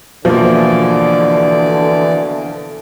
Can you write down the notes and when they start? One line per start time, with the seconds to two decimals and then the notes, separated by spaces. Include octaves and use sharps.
0.25 B2 D3 E3 F3 A#3 D5